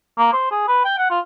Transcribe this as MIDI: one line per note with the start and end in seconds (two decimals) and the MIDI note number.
0.18 0.31 58
0.33 0.50 72
0.51 0.63 68
0.68 0.80 71
0.85 0.96 79
0.98 1.08 78
1.10 1.20 65